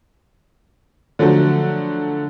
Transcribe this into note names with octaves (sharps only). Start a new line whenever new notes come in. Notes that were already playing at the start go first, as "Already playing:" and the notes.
D3 F3 F#3 A3